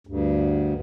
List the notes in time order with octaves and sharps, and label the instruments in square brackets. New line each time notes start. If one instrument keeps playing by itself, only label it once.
[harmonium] D2 G2